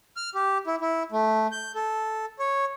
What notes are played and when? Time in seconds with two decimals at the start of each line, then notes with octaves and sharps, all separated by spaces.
0.17 F6
0.35 G4
0.67 E4
0.81 E4
1.12 A3
1.52 G6
1.75 A4
2.39 C#5